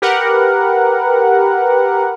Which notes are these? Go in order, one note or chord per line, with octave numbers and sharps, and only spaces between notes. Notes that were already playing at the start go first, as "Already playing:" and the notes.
G4 A#4 B4 F#5